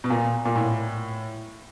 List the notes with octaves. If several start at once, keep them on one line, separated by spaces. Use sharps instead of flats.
B2
A#2
A#2
A2